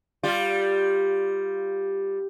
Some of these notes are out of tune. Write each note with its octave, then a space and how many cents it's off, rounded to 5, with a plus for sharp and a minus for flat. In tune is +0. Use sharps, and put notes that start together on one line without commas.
G3 +0 F4 +0